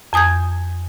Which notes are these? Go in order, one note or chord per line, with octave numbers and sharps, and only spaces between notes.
F2 G#5 D#6 G6 G#6